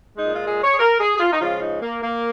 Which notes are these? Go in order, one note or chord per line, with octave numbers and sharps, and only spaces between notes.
A#2 G#3 D#4
F4
G#4
C#5
G#4
A#4
G#4
G#4
F4
D#4
C#3 F3 G#3 F4
D#4
A#3
A#3